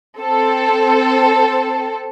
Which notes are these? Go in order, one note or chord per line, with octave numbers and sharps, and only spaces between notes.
C4 A4